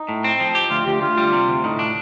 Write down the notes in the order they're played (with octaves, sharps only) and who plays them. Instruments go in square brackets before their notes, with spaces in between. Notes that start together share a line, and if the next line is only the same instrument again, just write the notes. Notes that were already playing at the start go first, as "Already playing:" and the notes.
Already playing: [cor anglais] D#4
[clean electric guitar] A2
C4
F3
G4
[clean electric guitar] D2 [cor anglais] F4
[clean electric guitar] D2 [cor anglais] G4
[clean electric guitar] D2 [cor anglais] F4
[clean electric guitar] G3
C3
D2
[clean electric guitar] A2 [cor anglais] D#4
[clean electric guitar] D4